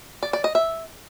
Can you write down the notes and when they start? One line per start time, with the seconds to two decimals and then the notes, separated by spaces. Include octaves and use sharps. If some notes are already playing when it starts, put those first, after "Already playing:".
0.23 D5
0.33 D5
0.44 D#5
0.55 E5